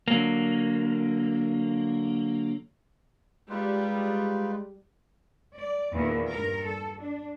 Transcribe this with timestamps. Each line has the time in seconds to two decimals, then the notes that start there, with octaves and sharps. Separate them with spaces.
0.08 D3 F#3 A#3
3.49 G3 G#3 D#4 F4 B4
5.55 D5
5.93 E2 A#2 D#3
6.30 G2 A#4
6.64 A4
7.00 D4